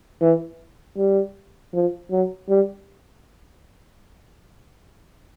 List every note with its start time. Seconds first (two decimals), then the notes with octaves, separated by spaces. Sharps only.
0.22 E3
0.97 G3
1.74 F3
2.11 F#3
2.49 G3